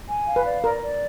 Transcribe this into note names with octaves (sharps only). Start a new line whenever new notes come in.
G#5
F5
B4
D5
A#4 D5
D5